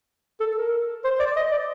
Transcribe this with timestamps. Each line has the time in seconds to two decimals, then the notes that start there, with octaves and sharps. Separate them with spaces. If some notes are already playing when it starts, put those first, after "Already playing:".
0.40 A4
0.56 A#4
1.04 C5
1.19 D5
1.36 D#5
1.51 D5